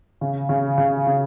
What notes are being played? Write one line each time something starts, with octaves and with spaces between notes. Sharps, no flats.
C#3
C#3
C#3
C#3